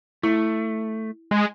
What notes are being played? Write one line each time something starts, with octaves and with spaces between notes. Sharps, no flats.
A3 E4
G#3